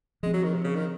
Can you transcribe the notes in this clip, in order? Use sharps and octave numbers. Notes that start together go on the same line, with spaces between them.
F3 G#3 C4
F#3
D#3
C3
C#3
D#3